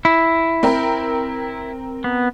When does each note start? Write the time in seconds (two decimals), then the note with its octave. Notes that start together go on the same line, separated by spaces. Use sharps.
0.05 E4
0.63 C4 A#4 G5
2.04 B3